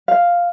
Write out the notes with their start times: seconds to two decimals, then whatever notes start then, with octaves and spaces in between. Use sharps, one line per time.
0.08 F5